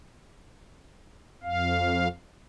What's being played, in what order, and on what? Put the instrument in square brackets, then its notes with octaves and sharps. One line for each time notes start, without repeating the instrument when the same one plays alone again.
[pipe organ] F2 F5